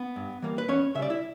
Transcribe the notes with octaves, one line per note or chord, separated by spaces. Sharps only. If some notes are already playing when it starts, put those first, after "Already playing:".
Already playing: B3
G2
E3 G3 A#3
B4
E2 C#4 C#5
C#3 G3 D5 E5
E4 E5